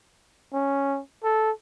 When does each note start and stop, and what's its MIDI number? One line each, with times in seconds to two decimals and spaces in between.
0.53 1.01 61
1.24 1.51 69